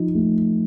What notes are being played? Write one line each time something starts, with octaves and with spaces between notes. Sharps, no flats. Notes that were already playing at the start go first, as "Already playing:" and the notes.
Already playing: F3 D#4
A3